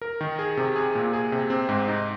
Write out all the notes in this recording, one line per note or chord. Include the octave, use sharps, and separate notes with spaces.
A#4
D#3
G#4
C3
G#4
A#2
G#4
C3
C4
G#2
D#4